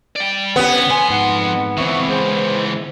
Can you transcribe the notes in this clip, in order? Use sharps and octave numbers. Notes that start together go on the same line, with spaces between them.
D5 G5
D3 B3 C#4 G4 B4 C#5
F2 G4 G#5 C6
G#2 F#5
C#2 E3 C4 E5 C#6
G#3 C5